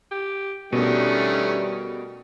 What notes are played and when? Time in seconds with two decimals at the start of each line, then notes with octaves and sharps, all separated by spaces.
0.11 G4
0.73 B2 D#3 G3 A3 C#4 D4